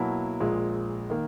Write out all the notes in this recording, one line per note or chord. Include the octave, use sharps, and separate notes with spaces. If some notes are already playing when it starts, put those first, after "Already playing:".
Already playing: B2 F#3 A#3 E4
A#1 A#2 G#3
D#3 A#3